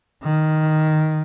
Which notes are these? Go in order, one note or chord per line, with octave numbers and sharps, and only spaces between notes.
D#3